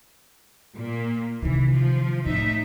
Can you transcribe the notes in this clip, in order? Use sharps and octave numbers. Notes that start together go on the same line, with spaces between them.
A#2 A#3
C3 D#3 E3
F3
A2 C4 D#4 E5